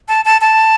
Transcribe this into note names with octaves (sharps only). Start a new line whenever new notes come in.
A5
A5
A5